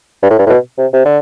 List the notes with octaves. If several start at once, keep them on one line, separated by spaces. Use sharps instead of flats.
G2
A2
G2
A2
B2
C3
C3
D3